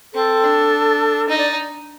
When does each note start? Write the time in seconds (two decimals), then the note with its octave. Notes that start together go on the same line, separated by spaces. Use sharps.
0.14 C4 A4
0.43 D4
1.29 D#4 D#5
1.38 D5